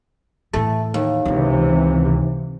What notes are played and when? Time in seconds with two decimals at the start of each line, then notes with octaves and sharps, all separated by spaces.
0.54 A2 E3 A3
0.94 D#2
1.25 C#2 C3 D#3 E3